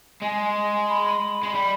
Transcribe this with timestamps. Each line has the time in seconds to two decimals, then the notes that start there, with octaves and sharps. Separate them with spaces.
0.22 G#3 G#5
0.88 B5
1.43 G#3
1.55 G3